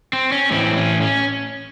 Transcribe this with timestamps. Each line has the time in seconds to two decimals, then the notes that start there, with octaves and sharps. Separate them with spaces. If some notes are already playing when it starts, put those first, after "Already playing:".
0.13 C4
0.32 C#4
0.51 A2 E3 C4
0.77 C#4
1.01 C#4